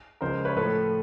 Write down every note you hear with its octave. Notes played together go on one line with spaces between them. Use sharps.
C#2 C#3 F3 G#3 A#4 C5
B4 C#5
A2 F3 A3 A4 B4